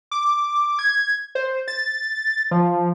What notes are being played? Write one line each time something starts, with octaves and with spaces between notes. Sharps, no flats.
D6
G#6
C5
A6
F3